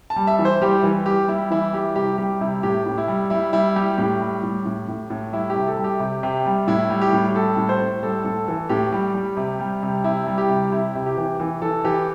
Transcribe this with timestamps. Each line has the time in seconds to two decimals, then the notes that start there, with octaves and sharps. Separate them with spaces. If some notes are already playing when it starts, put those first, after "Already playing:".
0.10 A5
0.16 G3
0.27 E5
0.39 E3
0.45 C5
0.61 G3 G4
0.83 E3
1.06 G3 G4
1.28 G3 E4
1.51 E3 E4
1.73 G3 G4
1.96 C3 G4
2.18 G3 G4
2.41 C3 E4
2.63 A2 G4
2.86 A2
2.98 E4
3.08 G3
3.30 G3 E4
3.53 G3 E4
3.76 G3 G4
3.98 A2 G4
4.20 G3
4.43 A2
4.66 A2
4.88 A2
5.10 A2
5.32 G3 E4
5.50 G4
5.55 C3
5.67 A4
5.77 G3
5.84 G4
6.00 C3
6.23 C3
6.46 G3
6.67 A2 E4
6.90 G3
7.02 G4
7.13 A2
7.29 G4
7.35 G3 A4
7.57 A2
7.69 C5
7.81 A2
8.03 G3 A4
8.25 A2 A4
8.47 E3 A4
8.69 A2 G4
8.92 G3
9.15 G3
9.37 C3
9.60 G3
9.83 C3
10.04 C3 E4
10.27 G3
10.38 G4
10.50 C3
10.72 C3 E4
10.95 C3
11.06 G4
11.17 E3
11.40 E3
11.62 E3 A4
11.85 E3 G4